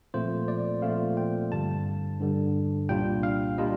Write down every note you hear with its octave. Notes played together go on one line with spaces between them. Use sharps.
A#2 F3 A3 C4 F4 C5
D5
A#2 F3 A3 C4 F4 F5
G5
G2 D3 G3 A5
G2 D3 G3
C2 A#2 G3 D4 F4 G5
F5
A#2 G3 D4 F4 D#5